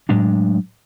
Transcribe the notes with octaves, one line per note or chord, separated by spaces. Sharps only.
A2 F#3 G#3 D4